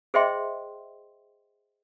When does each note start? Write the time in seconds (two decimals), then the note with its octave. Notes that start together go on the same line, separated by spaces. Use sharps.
0.14 G#4 C5 D#5 E5 G5 C6